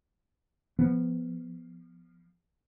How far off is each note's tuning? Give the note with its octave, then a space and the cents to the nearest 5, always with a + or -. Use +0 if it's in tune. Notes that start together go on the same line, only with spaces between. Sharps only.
F3 -5 B3 +0